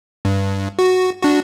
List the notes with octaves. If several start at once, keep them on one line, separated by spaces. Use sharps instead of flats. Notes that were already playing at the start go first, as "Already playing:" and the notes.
G2
F#4
D4 F#4